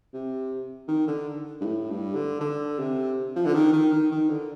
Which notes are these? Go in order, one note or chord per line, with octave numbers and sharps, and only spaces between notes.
C3
D#3
D3
G2
A2
G2
D3
D3
C3
F3
D3
D#3
D#3
D#3
D#3
D3